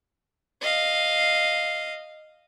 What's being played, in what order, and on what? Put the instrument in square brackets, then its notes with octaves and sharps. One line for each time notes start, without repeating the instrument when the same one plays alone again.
[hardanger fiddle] D#5 F5